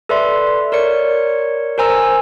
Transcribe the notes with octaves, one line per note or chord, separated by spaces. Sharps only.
A4 B4 D5 E5 C6
A#4 C#5 D5 C#7
A#4 C5 G#5 A#5 E6